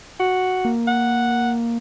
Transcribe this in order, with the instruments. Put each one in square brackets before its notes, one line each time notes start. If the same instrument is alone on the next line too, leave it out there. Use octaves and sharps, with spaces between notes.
[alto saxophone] F#4
[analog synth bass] A#3
[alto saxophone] F#5